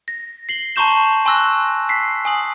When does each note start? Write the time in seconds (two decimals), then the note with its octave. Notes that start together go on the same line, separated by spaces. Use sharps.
0.08 A#6
0.49 C7 F#7 G7
0.76 A5 A#5 C6 C#6 G6 E7
1.26 G#5 C6 C#6 E6 F#6 A#6
1.89 B6 C7
2.25 G#5 D#6 F#7